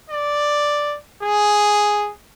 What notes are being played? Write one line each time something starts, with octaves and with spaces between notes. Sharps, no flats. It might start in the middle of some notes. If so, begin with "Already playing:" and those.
D5
G#4